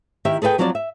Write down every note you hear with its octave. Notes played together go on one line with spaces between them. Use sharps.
D#3 E4 G4 E5
G#4 A4 B4 E5 G5
F3 F#3 C4 F4 C5 D5
E5